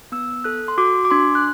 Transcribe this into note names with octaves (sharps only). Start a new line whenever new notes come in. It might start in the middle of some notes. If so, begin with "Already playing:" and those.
B3 E6
A4 F#6
C6
F#4 D6
D6
D4 C6
F#6